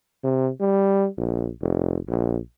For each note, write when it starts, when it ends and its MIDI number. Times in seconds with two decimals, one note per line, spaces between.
0.24 0.50 48
0.61 1.08 55
1.18 1.50 34
1.62 1.98 29
2.08 2.38 34